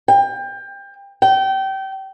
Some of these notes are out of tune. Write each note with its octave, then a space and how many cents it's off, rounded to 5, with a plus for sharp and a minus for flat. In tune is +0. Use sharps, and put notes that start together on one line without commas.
G5 +25
G5 -25